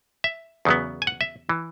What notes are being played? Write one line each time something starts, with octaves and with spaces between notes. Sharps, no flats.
E5
E2 C#3 F#3 B3
G#5
F#5
E5
E3